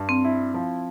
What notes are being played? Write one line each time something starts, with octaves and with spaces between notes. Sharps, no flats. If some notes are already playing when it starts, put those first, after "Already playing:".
Already playing: G2
C4
E4
F3